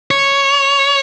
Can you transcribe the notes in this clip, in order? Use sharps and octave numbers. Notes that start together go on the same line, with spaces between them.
C#5